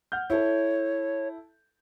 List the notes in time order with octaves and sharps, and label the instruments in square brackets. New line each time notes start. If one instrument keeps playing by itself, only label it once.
[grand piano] F#5 F6 G6
[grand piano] E4 A4 [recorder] C#5